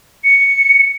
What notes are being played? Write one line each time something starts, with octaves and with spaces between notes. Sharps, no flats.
C#7